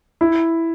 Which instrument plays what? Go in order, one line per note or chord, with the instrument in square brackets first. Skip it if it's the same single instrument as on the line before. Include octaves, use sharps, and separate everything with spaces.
[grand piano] E4